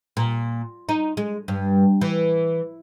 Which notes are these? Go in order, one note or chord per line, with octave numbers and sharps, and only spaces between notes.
A#2
D#4
G#3
G2
E3